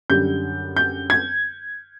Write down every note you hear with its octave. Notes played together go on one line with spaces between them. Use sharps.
F#2 D3 G3 G6
G6
G#6